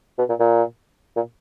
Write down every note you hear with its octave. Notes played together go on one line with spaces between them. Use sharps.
B2
A#2
A#2
A#2